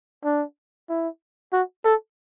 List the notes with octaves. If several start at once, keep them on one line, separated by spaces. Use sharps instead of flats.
D4
E4
F#4
A4